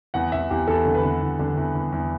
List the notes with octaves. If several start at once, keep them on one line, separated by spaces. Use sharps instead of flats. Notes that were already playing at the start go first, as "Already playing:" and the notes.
E2 F#5
E2 E5
E2 G4
E2 A4
D3
B4
D3
E2
D3
E2
E2
E2